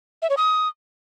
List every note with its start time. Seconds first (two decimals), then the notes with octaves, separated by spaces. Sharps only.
0.22 E5
0.30 C#5
0.37 D#6